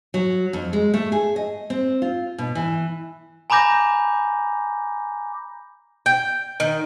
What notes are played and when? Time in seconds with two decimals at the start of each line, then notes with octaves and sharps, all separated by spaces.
0.14 F#3
0.53 F2
0.73 G#3
0.94 A3
1.12 G#4
1.36 D#5
1.70 C4
2.02 F4
2.38 B2
2.55 E3
3.50 G#5 A#5 B5 D6 G6 A#6
6.06 G5
6.60 D#3